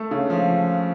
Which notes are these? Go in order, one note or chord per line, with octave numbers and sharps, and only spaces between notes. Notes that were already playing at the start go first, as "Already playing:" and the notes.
Already playing: A3 A4
C#3
F3